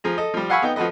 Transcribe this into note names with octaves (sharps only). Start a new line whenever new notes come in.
F3 G#4 A#5
A4 D#5
F3 G3
F5 F#5 G#5 B5 C#6 E6
B3 D#4 G5
F3 F#4 A4 B4 D#5